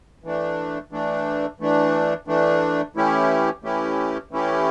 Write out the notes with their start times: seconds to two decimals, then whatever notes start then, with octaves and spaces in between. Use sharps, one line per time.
0.24 E3 A3 D4
0.91 E3 A3 D4
1.60 E3 A3 D4
2.27 E3 A3 D4
2.95 E3 A3 C#4 E4 G4
3.63 E3 A3 C#4 E4 G4
4.31 E3 A3 C#4 E4 G4